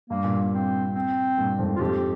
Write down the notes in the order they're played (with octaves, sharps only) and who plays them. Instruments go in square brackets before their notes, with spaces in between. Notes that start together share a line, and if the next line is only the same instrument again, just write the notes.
[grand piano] G2 [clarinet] A#3
[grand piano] G2 A#2
[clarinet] C4
C4
[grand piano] G2 A#2
F2 G#2
[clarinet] F4
[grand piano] F2 G#2 [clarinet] G4